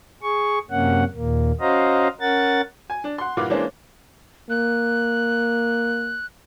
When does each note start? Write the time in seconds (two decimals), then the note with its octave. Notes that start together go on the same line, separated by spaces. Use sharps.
0.23 G#4 C#6
0.71 F#2 C3 A#3 C#4 F#5
1.14 D#2 A#2 A#3
1.61 C#4 F#4 C5 D#5 F5 A#5
2.21 C#4 A#4 F#5 A6
2.90 G#5
3.04 D4
3.18 F#5 C6
3.37 G2 A#2 E3 F5 F#5 D6
3.50 E3 G#3 A#3 C#4 D4 C5
4.50 A#3 F#6